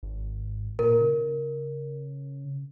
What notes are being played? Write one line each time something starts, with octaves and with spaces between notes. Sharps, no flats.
G#1
A#2 A#4
C#3